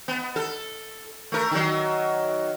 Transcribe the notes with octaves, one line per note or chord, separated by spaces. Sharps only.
B3
A4
A3 A#4
D#3 F#3